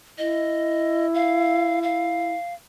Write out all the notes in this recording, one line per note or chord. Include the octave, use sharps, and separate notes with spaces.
E4 D#5
F5
F5